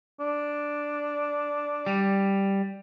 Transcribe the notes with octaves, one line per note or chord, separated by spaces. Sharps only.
D4
G3